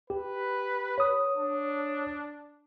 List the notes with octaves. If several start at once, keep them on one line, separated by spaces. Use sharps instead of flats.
G4 B4
C#5 D#6
D4